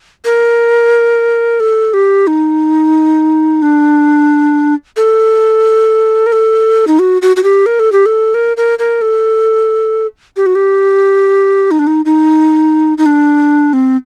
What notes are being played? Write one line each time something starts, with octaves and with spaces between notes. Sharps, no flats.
A#4
A4
G4
D#4
D4
A4
A#4
A4
D#4
F#4
F#4
F#4
G4
A#4
A4
G4
A4
A#4
A#4
A#4
A4
G4
F#4
G4
D#4
D4
D#4
D#4
D#4
D4
C4